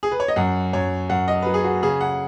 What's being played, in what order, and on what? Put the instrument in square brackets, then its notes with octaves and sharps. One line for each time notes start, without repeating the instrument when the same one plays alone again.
[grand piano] G#4
B4
C#5
D#5
F#2 F#5
F#2 C#5
F#2 F#5
D#5
F#3 B4
G#4
F#4
C#3 G#4
F#5